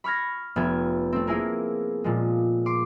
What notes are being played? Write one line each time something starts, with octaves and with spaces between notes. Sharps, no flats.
B5 C#6 F6 G#6 A#6
F1 B3 G#6
A3 C4
A#3 E4 G#4 A#4
A#2 F3 G#3
C6 D6